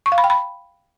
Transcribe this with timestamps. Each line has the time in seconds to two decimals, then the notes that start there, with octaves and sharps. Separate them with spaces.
0.06 C#6
0.12 F5
0.18 B5
0.24 G5
0.30 B5